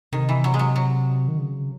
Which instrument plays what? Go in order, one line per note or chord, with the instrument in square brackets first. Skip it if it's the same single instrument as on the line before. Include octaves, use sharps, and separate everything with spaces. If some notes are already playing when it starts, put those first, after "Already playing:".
[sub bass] C3 [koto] D#3
[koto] E3
F#3
G#3
F#3
F#3
[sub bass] D#3
C#3